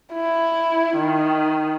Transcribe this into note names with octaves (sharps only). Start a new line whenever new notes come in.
E4
D#3